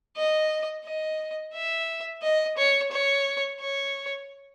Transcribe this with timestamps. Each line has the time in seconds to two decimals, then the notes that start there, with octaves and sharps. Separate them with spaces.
0.17 D#5
0.85 D#5
1.54 E5
2.22 D#5
2.57 C#5
2.91 C#5
3.60 C#5